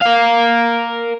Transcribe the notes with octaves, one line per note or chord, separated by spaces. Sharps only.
A#4 F5